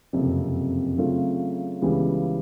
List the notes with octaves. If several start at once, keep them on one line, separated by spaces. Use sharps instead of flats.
F#1 F2 C3
C#3 F#3 A3 C4 F4
C#2 C#3 E3 G3 B3